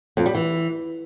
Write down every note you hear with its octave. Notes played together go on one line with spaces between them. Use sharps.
F2
G3
E3